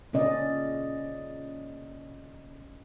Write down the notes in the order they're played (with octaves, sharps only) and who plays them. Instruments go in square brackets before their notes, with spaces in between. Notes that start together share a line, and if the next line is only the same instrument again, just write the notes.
[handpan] A#2 C#3 C#4 D5 D#5